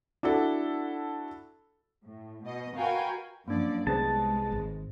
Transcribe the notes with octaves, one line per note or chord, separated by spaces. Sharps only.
D4 E4 F#4 A4
A2
B2 D#5
F#4 A#4 B4 F5 G5 G#5
F#2 F3 A#3 D4 D5
C2 G#3 B3 G#4 B4 C5 A5
G#1